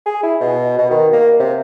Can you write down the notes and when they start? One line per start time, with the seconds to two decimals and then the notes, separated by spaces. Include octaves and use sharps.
0.06 G#4
0.23 E4
0.40 B2
0.78 B2
0.91 D#3
1.13 A#3
1.40 C3